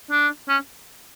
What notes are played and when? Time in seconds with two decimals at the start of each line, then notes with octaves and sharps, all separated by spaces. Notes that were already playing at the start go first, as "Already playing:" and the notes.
0.11 D4
0.49 C#4